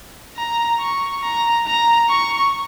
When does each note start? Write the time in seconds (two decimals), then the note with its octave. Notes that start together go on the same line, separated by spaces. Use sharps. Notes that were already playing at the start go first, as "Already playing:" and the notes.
0.37 A#5
0.80 C#6
1.22 A#5
1.66 A#5
2.09 C#6